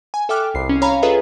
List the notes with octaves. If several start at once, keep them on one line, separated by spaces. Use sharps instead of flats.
G#5
A4 E5 G5 D6 F6 F#6
C2 C7
C#4
C#5 F5 G#5 A#5 B5
F4 G#4 A4 B4 D#5 E5